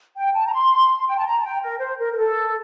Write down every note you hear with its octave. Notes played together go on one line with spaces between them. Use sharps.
G5
A5
A#5
C6
G5
A5
A#5
A5
G5
A#4
C5
A#4
A#4
A4